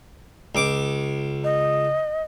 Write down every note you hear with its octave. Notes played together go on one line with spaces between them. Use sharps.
C#2 D6
D#5